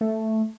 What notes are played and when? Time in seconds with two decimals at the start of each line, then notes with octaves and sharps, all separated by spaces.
0.01 A3